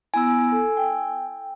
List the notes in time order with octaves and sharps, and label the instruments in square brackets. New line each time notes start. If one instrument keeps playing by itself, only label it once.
[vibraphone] B3 E4 [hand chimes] G#5 E6
[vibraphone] A4
G5